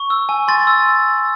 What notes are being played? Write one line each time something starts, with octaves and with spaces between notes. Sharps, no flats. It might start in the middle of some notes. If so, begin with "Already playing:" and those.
Already playing: C#6
E6
G#5
C6 A6
E6